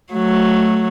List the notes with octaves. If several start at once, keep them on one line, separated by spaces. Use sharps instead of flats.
F#3 A3